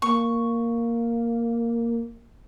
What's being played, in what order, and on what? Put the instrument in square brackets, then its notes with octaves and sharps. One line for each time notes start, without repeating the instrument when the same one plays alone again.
[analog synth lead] A#3 [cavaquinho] C#6